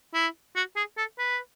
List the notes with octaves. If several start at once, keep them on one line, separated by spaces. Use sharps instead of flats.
E4
F#4
G#4
A4
B4